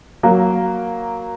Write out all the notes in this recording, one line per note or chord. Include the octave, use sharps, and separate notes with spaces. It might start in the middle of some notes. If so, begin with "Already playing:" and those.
F#3 A#3